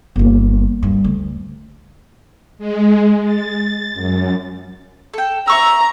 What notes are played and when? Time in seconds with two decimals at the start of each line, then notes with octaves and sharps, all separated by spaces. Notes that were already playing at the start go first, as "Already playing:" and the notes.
0.16 G1 A#3
0.83 G2
1.04 D2
2.58 G#3
3.24 A6
3.94 F#2
5.14 A4 G5
5.48 E5 A#5 C#6 E6